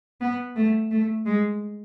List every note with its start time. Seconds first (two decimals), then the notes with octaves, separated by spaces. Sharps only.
0.21 B3
0.56 A3
0.91 A3
1.26 G#3